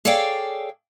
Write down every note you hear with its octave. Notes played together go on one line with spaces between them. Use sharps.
G#4 A4 C#5 D5 F5 G5